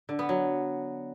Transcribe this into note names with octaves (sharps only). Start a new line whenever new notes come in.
D3
B3
F#3